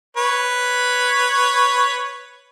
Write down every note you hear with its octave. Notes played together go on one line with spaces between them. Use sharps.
B4 C#5